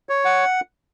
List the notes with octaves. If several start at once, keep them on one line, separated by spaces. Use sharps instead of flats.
C#5
F#5